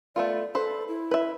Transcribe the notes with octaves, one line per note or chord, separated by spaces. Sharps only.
A3 B3 F4 D5
A4 B4 C5
E4
B4 E5